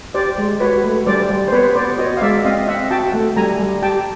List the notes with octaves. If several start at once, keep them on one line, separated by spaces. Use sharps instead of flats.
G4 C5 D5
G#3
F#4 B4 C#5
A3
G3 C5 D5
G3
C5
B3 B4 C#5
B3 C5 D5
F#4 C#5 D#5
F5
G#3 D5 E5
C4 D#5 F5
C4 E5 F#5
F#4 G5 A5
A3
G3 G#5 A#5
G3
G4 G5 A5